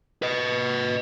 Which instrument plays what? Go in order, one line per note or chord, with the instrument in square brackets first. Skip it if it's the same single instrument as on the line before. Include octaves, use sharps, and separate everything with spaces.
[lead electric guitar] B4 D#5